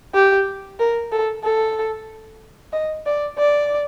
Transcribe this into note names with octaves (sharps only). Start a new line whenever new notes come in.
G4
A#4
A4
A4
D#5
D5
D5